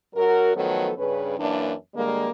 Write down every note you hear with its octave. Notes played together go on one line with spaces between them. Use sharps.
F#2 F#3 F#4 A#4
D#3 F3 F#3 A3 B3 A4
G2 C#3 C#4 G#4 B4
F#2 E3 A#3 D4
D3 G3 G#3 A#3